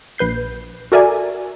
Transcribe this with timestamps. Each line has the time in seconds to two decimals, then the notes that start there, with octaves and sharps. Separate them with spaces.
0.18 A#1 B4 G6 C7
0.92 F#4 A4 A#4 D5 E5 G#5